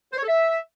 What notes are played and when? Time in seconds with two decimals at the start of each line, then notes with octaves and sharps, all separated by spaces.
0.12 C5
0.17 C#5
0.23 A4
0.28 E5